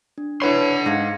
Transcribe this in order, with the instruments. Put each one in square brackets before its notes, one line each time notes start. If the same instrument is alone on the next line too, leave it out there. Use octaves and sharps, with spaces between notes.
[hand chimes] D4
[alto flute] D4 [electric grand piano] E4 B4 C#5 [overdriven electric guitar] F#5 C6 [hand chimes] B5
[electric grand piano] G#2 [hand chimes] F5 G#6 A#6